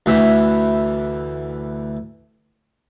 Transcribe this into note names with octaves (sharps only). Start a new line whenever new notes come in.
D2 E3 E4 E5